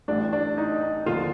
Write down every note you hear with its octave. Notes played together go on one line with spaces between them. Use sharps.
A1 A2 G3 D4
D4
D#4
D#2 D3 F3 F4